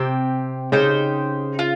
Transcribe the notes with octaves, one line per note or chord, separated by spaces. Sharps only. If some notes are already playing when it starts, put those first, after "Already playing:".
Already playing: C3 C4 G4
C#3 D#4 G4 C5
F4